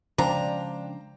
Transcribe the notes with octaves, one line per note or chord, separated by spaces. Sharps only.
C#3 F3 G#3 D4 C5 F5 G5 A#5